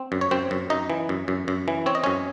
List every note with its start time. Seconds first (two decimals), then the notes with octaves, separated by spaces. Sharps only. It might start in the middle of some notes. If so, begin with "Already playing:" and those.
Already playing: C4
0.12 F#2
0.21 C#5
0.31 F#2 C4 C5
0.51 F#2
0.70 F#2 D#4 D#5
0.90 E3
1.09 F#2
1.28 F#2
1.48 F#2
1.68 E3
1.86 C4 C#5
1.95 D#5
2.04 F#2 C#4 C#5